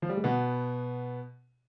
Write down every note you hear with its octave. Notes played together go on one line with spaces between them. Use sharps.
F3
G3
G#3
B2 B3